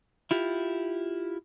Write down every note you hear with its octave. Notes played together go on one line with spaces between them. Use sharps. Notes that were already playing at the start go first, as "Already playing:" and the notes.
E4 F4 G4